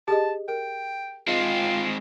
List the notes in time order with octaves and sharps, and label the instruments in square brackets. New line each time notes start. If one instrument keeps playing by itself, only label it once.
[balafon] G4 G#4 D#5 [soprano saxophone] A5
[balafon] A#4 [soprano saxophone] G5
[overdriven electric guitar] G#3 C4 [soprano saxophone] F4